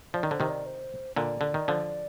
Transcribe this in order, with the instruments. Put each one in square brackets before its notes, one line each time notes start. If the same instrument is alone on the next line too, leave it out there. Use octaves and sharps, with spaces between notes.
[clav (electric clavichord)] F3 [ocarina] D5
[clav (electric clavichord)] D#3
[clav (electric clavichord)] D3 [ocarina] C5
[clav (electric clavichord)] C3 D#3
[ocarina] D5
C5
[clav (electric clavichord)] A#2 D3 [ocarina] D5
[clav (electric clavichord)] D3
D#3
D3 F3